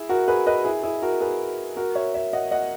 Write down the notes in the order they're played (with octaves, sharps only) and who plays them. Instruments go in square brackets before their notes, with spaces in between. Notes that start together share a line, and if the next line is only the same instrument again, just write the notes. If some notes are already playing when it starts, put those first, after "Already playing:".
Already playing: [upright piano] E4 G#4
F#4 A#4
G#4 B4
B4 D#5
E4 G#4
E4 G#4
F#4 A#4
G#4 B4
F#4 A#4
C#5 E5
C#5 E5
D#5 F#5
D#5 F#5